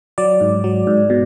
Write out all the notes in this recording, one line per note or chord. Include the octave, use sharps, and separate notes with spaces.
F#3 D5
G#2
F#3
G#2
B2